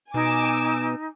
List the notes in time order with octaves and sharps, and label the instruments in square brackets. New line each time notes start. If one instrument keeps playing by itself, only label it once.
[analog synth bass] B2 [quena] D#4 [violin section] G#5 D6 E6